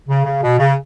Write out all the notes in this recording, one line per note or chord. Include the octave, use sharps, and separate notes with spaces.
C#3
C#3
B2
C#3